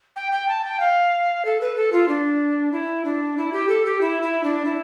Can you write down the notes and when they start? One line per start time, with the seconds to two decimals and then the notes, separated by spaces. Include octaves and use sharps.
0.16 G5
0.32 G5
0.48 A5
0.64 G5
0.80 F5
1.45 A4
1.61 B4
1.76 A4
1.93 F4
2.08 D4
2.72 E4
3.05 D4
3.37 E4
3.53 G4
3.69 A4
3.85 G4
4.01 E4
4.22 E4
4.44 D4
4.65 E4